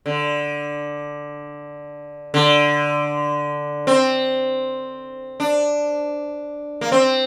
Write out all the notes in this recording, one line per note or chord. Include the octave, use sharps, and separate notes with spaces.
D3
D3
C4
D4
A#3
C4